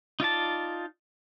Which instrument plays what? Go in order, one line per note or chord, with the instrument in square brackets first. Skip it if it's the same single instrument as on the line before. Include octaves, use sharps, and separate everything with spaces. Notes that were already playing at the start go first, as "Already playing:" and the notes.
[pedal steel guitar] D#4 F4 D5 A5